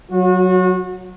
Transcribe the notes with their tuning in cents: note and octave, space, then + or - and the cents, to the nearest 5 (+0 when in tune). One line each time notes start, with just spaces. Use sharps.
F#3 +0 F#4 -35